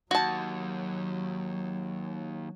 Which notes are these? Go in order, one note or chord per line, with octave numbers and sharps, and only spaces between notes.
D#2 F#3 F#4 A5